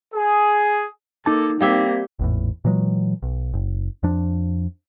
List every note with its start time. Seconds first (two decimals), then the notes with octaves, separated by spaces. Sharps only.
0.15 G#4
1.26 A#3 D#4 A4 A5 D6
1.61 G3 A#3 C4 G4 E5 F5 G#6 B6
2.19 G#1 E2 A2
2.65 A#2 E3 F#3 G#3
3.23 B1
3.54 F#1
4.03 F2 F3 D4